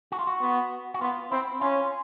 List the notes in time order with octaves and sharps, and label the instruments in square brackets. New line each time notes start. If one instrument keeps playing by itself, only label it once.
[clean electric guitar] F#4
F4
F#4
[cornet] B3
[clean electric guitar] F#4
[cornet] B3 [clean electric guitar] F4
[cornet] C4 [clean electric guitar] E4
[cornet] C#4 [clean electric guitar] F4